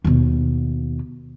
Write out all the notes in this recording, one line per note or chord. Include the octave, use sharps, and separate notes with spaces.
D#2 B2